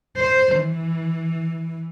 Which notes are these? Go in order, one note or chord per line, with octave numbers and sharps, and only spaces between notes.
C5
E3